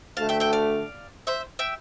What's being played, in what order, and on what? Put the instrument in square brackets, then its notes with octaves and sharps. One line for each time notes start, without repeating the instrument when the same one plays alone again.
[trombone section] D2 D3 A3 [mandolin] F5 A5
[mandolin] E5 G5
E5 G5
D5 F5
C5 E5
E5 G5